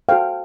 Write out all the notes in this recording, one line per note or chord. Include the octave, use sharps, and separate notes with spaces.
F#4 A4 C5 F5 G5